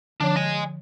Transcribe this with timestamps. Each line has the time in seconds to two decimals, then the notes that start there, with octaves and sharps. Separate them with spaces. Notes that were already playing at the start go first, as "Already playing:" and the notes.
0.20 D3 F3 D4 C#5
0.36 D#5 G#5